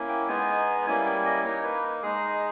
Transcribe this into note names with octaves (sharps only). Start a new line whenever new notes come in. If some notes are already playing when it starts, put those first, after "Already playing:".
Already playing: A#3 C#4 E4
G5
G#3 B3 D#4 G#5
G3 A#3 C#4 E4 G#5
G5
D#5
A#3 D#4 C#5
B4
G#3 D#4 G#4